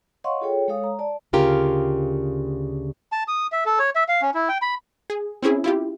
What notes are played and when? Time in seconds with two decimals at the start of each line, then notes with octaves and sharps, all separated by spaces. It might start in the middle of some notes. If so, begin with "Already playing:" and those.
0.24 C#5 D#5 F5 F#5 C6 C#6
0.41 F4 G#4 A4 C#5 G5
0.68 G#3 A4 C#5 F5 D#6
0.84 A#5
0.99 D5 A5
1.33 D2 C#3 F4 G4 A#4
3.12 A5
3.28 D#6
3.52 E5
3.66 A4
3.79 C#5
3.95 E5
4.08 F5
4.22 C#4
4.34 E4
4.49 G5
4.62 B5
5.10 G#4
5.42 C4 C#4 E4 G#4
5.64 E4 F4 G4